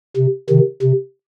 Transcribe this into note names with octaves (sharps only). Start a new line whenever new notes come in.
C3
C3 D#3
C3